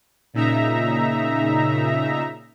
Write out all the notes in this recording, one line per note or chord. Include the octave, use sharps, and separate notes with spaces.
A#2 C#3 D#4 E5 A#5